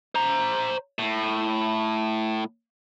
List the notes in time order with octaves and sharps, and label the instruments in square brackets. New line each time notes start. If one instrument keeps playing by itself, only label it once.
[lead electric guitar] C5 A#5
A2